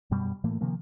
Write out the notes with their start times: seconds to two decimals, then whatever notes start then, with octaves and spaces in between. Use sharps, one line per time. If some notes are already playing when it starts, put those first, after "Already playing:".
0.11 F#2 B2 G3
0.44 A2 E3 A3 A#3
0.61 C3 D#3 F3 A#3